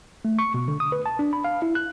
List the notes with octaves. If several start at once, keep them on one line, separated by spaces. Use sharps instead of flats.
A3
C#6
B2
D3
D#6
B4
A5
D4
B5
F5
E4
F#6